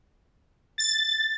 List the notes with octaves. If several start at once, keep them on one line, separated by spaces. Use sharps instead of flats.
A6